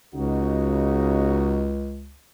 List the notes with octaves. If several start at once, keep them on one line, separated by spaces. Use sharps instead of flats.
C#2 C#3 D#4 F#4